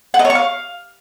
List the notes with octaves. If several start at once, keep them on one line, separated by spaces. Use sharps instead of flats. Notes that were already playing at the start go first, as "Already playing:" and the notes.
F#5
D#5
C#5
C#6
F5